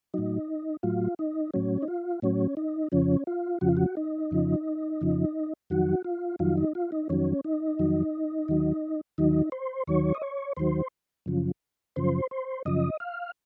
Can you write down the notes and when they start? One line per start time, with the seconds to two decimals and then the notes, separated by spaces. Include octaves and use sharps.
0.14 A2 F#3 D#4
0.83 A2 F#3 F4
1.19 D#4
1.54 A2 F#3 C#4
1.82 D#4
1.88 F4
2.22 A2 F#3 C#4
2.57 D#4
2.92 F2 C#3 F3 C#4
3.27 F4
3.61 F2 C#3 F3 F#4
3.68 F4
3.77 F#4
3.97 D#4
4.31 F2 C#3 F3
5.01 F2 C#3 F3
5.70 F2 D#3 F#3 F#4
6.04 F4
6.39 F2 D#3 F#3 F4
6.57 D#4
6.75 F4
6.92 D#4
7.09 F2 D#3 F#3 C#4
7.44 D#4
7.79 F2 D#3 F#3
8.48 D#2 D#3 F#3
9.18 D#2 D#3 F#3 D#4
9.52 C5
9.87 D#2 D#3 F#3 C#5
10.15 D#5
10.22 C#5
10.57 D#2 D#3 F#3 C5
11.26 F#2 C#3 F3
11.96 F#2 C#3 F3 C5
12.31 C5
12.65 F#2 C#3 F3 D#5
13.00 F5